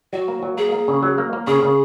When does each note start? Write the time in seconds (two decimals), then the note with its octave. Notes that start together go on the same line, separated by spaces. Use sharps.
0.13 F#3 F#4
0.28 A#3
0.43 F#3
0.57 A#3 G#4
0.72 A#3
0.88 C#3
1.03 F#3
1.18 A#3
1.33 A#3
1.47 C#3 G#4
1.63 C#3